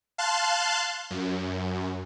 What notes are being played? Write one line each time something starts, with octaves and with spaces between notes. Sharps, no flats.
F5 A5 C6 F#6
F#2